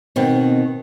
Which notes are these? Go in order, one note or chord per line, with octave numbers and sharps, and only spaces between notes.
B2 D#3 C4